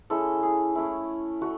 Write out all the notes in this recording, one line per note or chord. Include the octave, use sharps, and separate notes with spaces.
G#3 C#4 E4 A4
G#4
A3 C#4 E4
A3 F#4